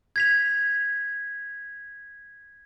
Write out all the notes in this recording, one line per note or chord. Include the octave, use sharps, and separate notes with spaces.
G#6 B6 F7